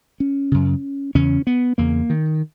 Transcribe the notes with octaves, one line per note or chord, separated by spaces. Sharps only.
C#4
F#2 C#3
E2 C#3 C#4
B3
E2 C#3 A#3
D#3